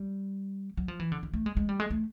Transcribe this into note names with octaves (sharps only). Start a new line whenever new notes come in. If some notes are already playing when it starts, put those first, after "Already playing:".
Already playing: G3
F#3
F3
E3
D3
D#3
A3
G#3
G#3
G3
G#3
A3